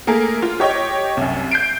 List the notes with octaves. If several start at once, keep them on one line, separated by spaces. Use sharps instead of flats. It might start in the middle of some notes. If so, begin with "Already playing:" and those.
A3 A#3 G#4 A#4
F4
G4 C#5 D#5 G5
C2 F#2
G6 C7 D7